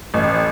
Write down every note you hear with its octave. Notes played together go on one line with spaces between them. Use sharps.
A1